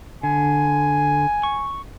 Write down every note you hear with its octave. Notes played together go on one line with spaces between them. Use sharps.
D3 G#5
C#6